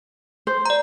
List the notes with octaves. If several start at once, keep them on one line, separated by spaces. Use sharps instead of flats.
C5
D5 A#5